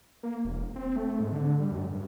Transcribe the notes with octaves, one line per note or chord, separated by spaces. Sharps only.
A#3
E1
C4
A3
G#2
D3
G3
F#2
G2